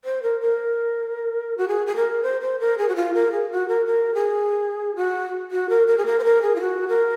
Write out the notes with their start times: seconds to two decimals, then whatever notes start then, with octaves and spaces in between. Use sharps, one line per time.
0.05 C5
0.23 A#4
0.41 A#4
1.58 F#4
1.68 G#4
1.87 G#4
1.96 A#4
2.23 C5
2.41 C5
2.60 A#4
2.78 G#4
2.89 F#4
2.96 F4
3.14 A#4
3.32 G#4
3.51 F#4
3.68 A#4
3.86 A#4
4.15 G#4
4.96 F#4
5.51 F#4
5.69 A#4
5.87 A#4
5.98 G#4
6.06 A#4
6.19 C5
6.24 A#4
6.42 G#4
6.56 F4
6.61 F#4
6.88 A#4